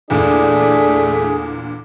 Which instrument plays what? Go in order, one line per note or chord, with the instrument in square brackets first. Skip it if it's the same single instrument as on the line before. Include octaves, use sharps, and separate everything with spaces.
[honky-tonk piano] E2 A#2 D3 [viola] A3 [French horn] D4 [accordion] G#4